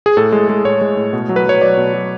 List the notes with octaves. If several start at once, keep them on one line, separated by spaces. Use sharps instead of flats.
G#4
A2 A4
G#3
G#3
A2 C#5
G#3
A2
B2
F#3
B4
F#3 C#5
F#3 D5
B2
F#3